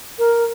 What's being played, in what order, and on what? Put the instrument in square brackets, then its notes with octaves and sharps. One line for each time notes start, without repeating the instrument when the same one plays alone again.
[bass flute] A#4